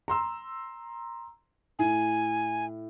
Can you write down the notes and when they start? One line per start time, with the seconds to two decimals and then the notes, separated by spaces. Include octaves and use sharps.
0.08 A#5 C6 E6
1.79 A2 G#5